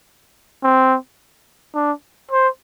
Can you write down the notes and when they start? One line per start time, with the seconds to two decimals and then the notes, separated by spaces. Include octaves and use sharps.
0.63 C4
1.75 D4
2.31 C5